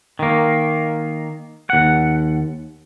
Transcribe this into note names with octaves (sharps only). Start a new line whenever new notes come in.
D#3 A#3
D#2 F#5